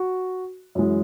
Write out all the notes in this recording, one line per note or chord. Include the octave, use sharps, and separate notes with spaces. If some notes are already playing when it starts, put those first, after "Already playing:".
Already playing: F#4
F#2 E3 G#3